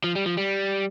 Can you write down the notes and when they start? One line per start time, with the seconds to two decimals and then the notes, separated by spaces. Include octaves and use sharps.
0.04 F3
0.15 G3
0.26 F3
0.37 G3